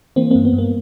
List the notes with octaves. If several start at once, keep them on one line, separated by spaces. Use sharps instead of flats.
E3 A#3 C4
A#3 C4
G2
B3
G2
A#3